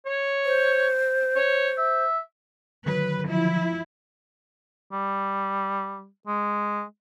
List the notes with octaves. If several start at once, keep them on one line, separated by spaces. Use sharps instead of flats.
C#5
C5
C#5
E5
D3 D#3 F#3 B4
F3 E4
G3
G#3